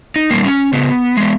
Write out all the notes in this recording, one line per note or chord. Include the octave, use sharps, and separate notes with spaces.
D#4
G3 A#3
C#4
C#3 B3
G#3 B3